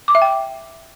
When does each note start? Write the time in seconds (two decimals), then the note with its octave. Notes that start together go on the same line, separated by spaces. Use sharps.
0.08 D6
0.15 E5
0.22 G5